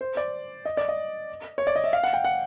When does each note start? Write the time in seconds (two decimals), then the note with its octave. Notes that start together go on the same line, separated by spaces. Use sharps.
0.01 C5
0.17 D5
0.65 D#5
0.77 D5
0.89 D#5
1.58 C#5
1.67 D5
1.76 D#5
1.84 E5
1.93 F5
2.03 F#5
2.13 G5
2.24 F#5